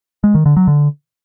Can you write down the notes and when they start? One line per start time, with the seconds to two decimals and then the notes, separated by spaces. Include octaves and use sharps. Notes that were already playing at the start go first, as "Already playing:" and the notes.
0.24 G#3
0.35 D#3
0.46 D3
0.57 F#3
0.67 D3